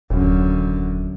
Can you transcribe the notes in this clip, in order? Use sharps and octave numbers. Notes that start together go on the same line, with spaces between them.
D#1 F#2 D3